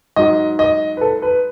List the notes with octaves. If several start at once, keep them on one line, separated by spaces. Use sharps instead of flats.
G#2 F#3 D#5
D#5
B4
A4
B4